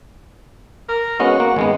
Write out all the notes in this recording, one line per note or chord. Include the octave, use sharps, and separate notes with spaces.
A#4
G#3 B3 C#4 F#4
A#3
G#1 G#3 B3